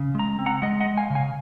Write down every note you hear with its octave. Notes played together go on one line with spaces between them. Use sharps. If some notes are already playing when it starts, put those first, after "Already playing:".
Already playing: C#3
G#3 A#5
C4
F#5 A#5
G#3 D#5 F#5
D#5 F#5
G#3
F5 G#5
C#3
F5 G#5